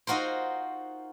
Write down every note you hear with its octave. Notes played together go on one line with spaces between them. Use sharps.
D#4 F4 F#4 A#4 C5